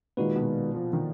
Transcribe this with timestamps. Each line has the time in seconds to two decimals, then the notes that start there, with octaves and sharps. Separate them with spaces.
0.17 A#2 D#3 G#3 D#4 F#4 B4
0.36 B2
0.75 F3
0.93 D#3